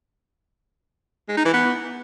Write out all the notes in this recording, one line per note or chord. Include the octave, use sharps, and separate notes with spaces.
G#3
D#4
E3
B3